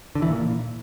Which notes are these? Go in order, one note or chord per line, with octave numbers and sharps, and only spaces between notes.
D3
E3
A#2